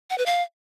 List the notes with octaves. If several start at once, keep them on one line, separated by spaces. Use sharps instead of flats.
F#5
B4
F5